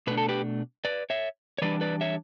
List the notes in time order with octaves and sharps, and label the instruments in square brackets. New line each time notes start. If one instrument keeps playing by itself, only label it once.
[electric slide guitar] B2 A3 D4 B4
A4
G4 B4
B4 D5
C#5 E5
C#5
E3 G3 D4 B4 D5
B4 D5
C#5 E5